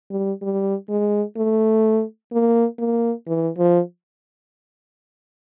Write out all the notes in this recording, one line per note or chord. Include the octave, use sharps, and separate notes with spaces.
G3
G3
G#3
A3
A#3
A#3
E3
F3